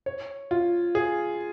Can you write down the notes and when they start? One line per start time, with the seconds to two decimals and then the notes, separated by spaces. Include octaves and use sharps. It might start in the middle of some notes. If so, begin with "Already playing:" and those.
0.06 C#5
0.51 F4
0.95 G#4